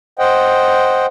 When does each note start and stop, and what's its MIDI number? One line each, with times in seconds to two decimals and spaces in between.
0.19 1.06 72
0.19 1.06 75
0.19 1.06 78
0.19 1.06 79